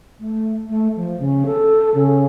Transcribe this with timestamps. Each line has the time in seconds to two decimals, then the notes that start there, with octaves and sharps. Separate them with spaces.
0.20 A3
0.69 A3
0.96 F3
1.19 C#3
1.46 A4
1.94 C#3